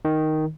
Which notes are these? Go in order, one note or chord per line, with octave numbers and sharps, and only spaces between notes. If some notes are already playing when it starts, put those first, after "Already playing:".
D#3